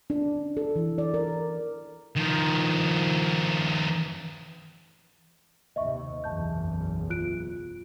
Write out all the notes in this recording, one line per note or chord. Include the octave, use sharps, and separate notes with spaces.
D4
A4
E3
D5
A#4
D#3 F3
D#2 C3 D#5 E5 C#6
F#1 B1 E2 A5 G6
F4 F#6 D7